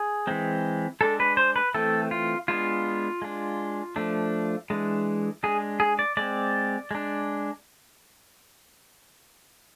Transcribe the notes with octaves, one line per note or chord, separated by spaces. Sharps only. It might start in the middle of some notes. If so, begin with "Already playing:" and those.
Already playing: G#4
E3 G#3 C4
G#3 D4 A4
B4
C5
B4
E3 A3 C4 A4
F4
G#3 B3 D4 F4
G#3 D4
F3 A3 D4
E3 G#3 D4
G#3 D4 G#4
G#4
D5
G#3 C4 D5
G#3 D4